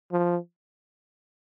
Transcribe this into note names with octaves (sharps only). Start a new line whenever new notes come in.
F3